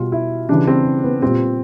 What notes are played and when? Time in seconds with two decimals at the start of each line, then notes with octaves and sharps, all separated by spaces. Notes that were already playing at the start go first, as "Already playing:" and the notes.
Already playing: B2 G3 F4
0.12 E4
0.49 C#3 E3 G3 D4
0.67 C4
1.04 B3
1.22 A#2 G3 C4